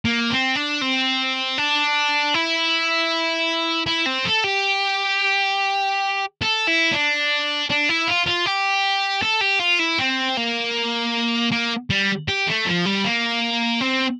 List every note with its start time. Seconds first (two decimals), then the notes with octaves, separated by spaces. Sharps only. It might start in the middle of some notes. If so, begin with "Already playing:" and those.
0.05 A#3
0.30 C4
0.56 D4
0.81 C4
1.58 D4
2.34 E4
3.87 E4
4.06 C4
4.25 A4
4.44 G4
6.42 A4
6.68 E4
6.93 D4
7.70 D4
7.89 E4
8.08 F4
8.26 F4
8.46 G4
9.22 A4
9.41 G4
9.60 F4
9.80 E4
9.99 C4
10.37 A#3
11.52 A#3
11.90 G3
12.28 G4
12.47 A3
12.66 F3
12.85 G3
13.05 A#3
13.81 C4